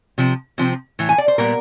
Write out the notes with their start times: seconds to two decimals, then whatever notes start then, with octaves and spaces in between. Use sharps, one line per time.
0.18 C3 F3
0.58 C3 F3 C4
0.99 A2 E3
1.09 G#5
1.18 D5
1.28 C5
1.38 A#2 G3 B3 A#4